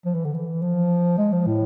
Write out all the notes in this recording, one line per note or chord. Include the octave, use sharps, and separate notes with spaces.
F3
E3
D3
E3
F3
G#3
F3
A2